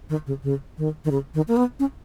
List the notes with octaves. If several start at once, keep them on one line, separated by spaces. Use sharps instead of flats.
D#3
C#3
C#3
D#3
D#3
C#3
D#3
A#3
B3
C#4